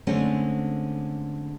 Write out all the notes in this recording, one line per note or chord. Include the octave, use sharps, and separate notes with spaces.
D3 G#3 A3 C4 C#4